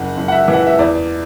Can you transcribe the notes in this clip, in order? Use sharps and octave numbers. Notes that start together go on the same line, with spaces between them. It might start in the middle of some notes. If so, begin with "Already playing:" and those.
Already playing: F#1 F#5
F#1
F#5
E5
E3
F#5
E5
E2 D5